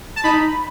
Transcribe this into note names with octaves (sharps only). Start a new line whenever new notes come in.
A5
D#4 B5